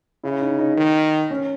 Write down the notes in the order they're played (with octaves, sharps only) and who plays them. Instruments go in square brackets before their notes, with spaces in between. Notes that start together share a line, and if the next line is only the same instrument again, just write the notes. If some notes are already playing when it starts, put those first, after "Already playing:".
[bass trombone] C#3 [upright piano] E4
[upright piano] D#4
D#4
[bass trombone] D#3
[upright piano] C#4